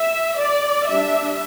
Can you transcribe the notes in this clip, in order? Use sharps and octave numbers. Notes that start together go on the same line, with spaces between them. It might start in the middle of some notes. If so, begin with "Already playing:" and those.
Already playing: E5
D5
G3 D4 E5